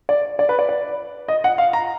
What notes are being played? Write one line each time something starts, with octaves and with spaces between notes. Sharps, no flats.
D5
D5
B4
D5
D5
D#5
F#5
F5
A#5